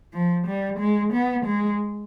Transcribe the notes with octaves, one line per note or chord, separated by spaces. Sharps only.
F3
G3
G#3
B3
G#3